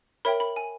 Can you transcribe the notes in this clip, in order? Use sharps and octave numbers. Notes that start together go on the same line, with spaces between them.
A#4 C#5 E5 G5 B5
B5
G#5